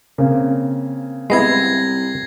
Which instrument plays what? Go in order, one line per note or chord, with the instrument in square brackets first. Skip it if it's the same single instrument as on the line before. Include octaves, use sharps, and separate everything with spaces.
[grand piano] C#3 A#3 C4
[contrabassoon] C2 [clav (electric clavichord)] G#3 B3 E4 [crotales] G#6 A#6 C7